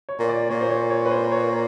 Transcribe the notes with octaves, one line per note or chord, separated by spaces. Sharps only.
C#5
A#2
D5
A#2 C#5
C5
C#5
C#5
B4
C5
C#5